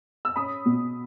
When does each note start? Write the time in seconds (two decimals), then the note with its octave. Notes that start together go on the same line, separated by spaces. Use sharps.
0.25 E6
0.36 C#4 B5 D#6
0.66 B2